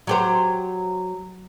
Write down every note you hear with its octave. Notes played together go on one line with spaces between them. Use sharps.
F#3 G4 C5